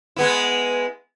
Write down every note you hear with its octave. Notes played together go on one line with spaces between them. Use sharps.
G#3 B3 E4